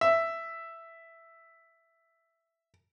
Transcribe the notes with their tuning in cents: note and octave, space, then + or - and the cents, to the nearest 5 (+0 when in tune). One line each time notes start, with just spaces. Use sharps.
E5 +5